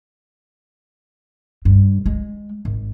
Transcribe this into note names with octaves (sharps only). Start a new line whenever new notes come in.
G2
G#3
G#1